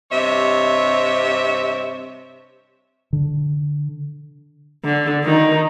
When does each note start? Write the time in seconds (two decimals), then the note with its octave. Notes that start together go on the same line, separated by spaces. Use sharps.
0.11 G2 C3 C#5 D#5 E5
3.13 D3
4.84 D3
5.24 D#3 D#4